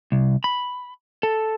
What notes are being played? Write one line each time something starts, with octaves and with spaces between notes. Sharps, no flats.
C2
B5
A4